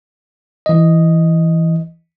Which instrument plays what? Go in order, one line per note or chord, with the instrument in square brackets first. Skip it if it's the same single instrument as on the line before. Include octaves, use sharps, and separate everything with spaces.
[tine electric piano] E3 D#5